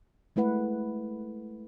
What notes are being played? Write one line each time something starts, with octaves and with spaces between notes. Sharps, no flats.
G#3 A3 E4 B4 F#5